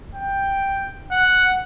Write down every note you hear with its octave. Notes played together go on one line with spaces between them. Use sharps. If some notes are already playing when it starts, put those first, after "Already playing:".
G5
F#5